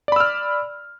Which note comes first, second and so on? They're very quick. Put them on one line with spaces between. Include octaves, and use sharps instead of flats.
D5 B5 E6 F6